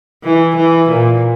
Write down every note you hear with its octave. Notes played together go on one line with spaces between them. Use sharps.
E3
E3
A#2